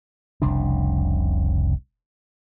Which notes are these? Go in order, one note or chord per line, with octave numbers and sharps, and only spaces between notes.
F1 C2 C#3 D4